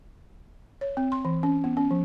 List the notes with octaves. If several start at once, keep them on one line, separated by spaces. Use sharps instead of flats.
C#5
C4
C6
E3
C#4
B3
C#4
F3